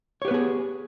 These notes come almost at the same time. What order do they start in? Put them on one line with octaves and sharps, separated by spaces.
C#5 G4 B4 B3 G#4